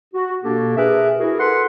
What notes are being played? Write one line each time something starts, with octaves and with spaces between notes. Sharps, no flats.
F#4
B2 A#3 D4 G4 A4
G#4 A#4 B4 E5
E4 F#4 G#4 A#4
A4 B4 F#5 C6